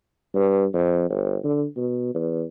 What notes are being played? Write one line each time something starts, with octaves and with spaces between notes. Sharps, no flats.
G2
F2
G1
D3
B2
E2